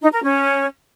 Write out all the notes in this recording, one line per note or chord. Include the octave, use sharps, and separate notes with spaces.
D#4
A#4
C#4